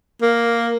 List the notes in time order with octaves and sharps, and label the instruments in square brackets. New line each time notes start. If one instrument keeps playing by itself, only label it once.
[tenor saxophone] A#3